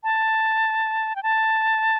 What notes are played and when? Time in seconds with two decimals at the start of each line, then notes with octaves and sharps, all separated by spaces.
0.04 A5
1.16 G5
1.23 A5